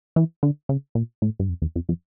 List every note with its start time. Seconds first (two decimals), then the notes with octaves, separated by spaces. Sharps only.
0.16 E3
0.43 D3
0.69 C#3
0.95 A#2
1.22 A2
1.39 G2
1.49 F2
1.62 E2
1.76 F2
1.89 F2